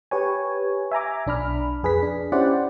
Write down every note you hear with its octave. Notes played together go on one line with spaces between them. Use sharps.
G4 B4 C#5 G#5
E5 G#5 A#5 D6
B1 D4 B5 F6
F2 G#4 B4 B6
D4
C#4 E4 G4 C5 D5 F#5